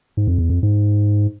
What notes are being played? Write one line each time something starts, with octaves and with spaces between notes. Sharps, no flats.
G#2
F2
E2
F2
G#2